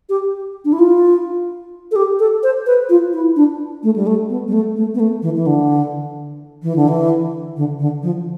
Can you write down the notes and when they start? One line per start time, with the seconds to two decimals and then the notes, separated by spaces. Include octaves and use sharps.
0.09 G4
0.65 D4
0.73 E4
0.79 F4
1.91 A4
1.96 G4
2.19 A4
2.43 C5
2.66 B4
2.89 F4
3.13 E4
3.36 D4
3.83 A3
3.96 G3
4.07 A3
4.29 B3
4.47 G3
4.53 A3
4.76 A3
4.94 B3
4.99 A3
5.22 E3
5.35 E3
5.46 D3
6.63 E3
6.76 D3
6.88 E3
7.57 D3
7.79 D3
8.03 F3